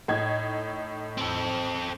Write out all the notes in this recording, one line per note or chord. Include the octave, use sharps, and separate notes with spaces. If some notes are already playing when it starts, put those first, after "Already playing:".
A2 D#4 G#6
C4 A4